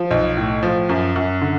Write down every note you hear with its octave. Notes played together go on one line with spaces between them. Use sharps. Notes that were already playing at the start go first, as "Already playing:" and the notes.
Already playing: F3
B1
A2
F3
F#2
F#2
D3